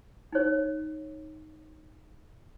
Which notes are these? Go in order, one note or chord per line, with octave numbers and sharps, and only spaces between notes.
D#4 C#5